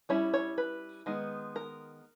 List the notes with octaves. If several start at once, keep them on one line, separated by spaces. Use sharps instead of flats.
G3 C#4 E4 C#5
C#5
B4
D#3 G#3 B3 D#4
A#4